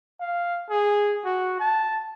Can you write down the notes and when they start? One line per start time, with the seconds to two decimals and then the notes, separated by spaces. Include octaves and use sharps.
0.20 F5
0.70 G#4
1.24 F#4
1.60 A5